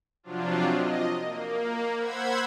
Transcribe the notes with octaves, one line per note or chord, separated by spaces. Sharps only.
C3 F3 F#3 D4 F4
D#5
A#3
C5 F#5 B5 E6 G#6